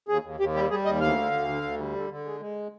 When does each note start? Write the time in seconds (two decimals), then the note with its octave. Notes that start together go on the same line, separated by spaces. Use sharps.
0.08 D#2 G#4
0.23 D#2
0.40 D#2 G4
0.54 G3 G4
0.70 G3 G#4
0.85 D#2 D#5
1.01 D2 F5
1.16 D3
1.32 D2
1.48 D3
1.63 D2
1.78 G3
1.95 D3
2.10 D3
2.25 G#3
2.40 G#3